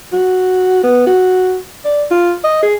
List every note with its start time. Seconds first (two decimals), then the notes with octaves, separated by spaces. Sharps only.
0.13 F#4
0.84 B3
1.07 F#4
1.85 D5
2.11 F4
2.44 D#5
2.63 G#4